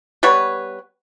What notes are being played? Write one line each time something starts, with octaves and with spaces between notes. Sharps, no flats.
G3 B3 B4 C#5